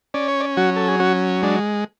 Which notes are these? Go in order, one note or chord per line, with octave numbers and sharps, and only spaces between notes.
C#4 D5
C#5
D5
F#3 F#4
A4
G#4
C#4 F#4
G#3 D4